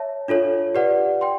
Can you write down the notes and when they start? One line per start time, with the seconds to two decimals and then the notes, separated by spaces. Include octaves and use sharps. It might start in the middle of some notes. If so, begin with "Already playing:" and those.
Already playing: C#5 E5 A5
0.28 D4 F4 A4 C#5
0.75 G4 B4 D5 F#5
1.21 G5 C6